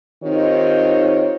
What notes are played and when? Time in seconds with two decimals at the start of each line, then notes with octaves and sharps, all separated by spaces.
0.23 D#3 C4 D#4 F4 G4 C#5